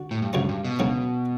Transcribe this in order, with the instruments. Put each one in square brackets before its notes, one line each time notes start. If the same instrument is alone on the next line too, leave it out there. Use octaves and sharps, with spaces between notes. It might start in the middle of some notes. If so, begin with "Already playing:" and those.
Already playing: [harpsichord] D3 F#4
[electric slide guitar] A2
G2
[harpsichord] D2 C#3 F#3 C#4 [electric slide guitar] G2
[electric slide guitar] G2
B2
[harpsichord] D2 C#3 F#3 C#4